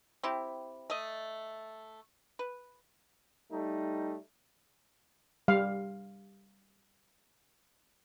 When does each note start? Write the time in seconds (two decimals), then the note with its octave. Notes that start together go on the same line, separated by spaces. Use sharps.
0.23 C4 E4 G4
0.90 A3 D#5
2.39 B4
3.52 G3 A3 D#4
5.48 G3 F5